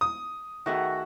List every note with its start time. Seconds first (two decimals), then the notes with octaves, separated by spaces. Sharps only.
0.01 D#6
0.66 D#3 A3 F#4 G#4 E5 F#5